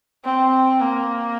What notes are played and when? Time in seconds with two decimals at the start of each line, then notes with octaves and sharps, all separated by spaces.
0.25 C4
0.81 A#3